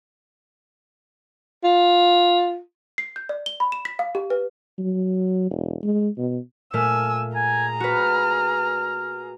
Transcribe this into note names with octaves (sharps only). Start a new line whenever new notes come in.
F4
C7
G6
D5
G7
B5
E7
B6
F5
G4
B4
F#3
E1
G#3
B2
A#2 A3 G#5 E6 F6
G#4 G#5 A#5
F#4 B4 F6